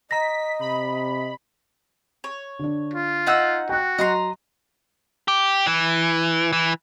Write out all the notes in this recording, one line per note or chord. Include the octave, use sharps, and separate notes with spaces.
D#5 A#5 A#6 B6
C3 B5
C#5
D3 D4
F4
D#4 F#5 E6
F#4 G5 F#6
F#3 D#5 A#5 C6
G4
E3
E3